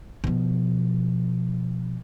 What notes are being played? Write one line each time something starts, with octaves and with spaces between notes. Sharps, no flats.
B2 F3